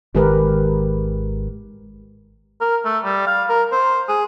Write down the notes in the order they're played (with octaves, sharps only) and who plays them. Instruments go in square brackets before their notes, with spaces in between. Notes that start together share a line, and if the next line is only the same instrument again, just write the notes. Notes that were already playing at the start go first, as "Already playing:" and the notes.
[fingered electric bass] G#1 D#3 G#3 [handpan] G4 A#4 B4
[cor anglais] A#4
A3
G3
F5
A#4
C5
G#4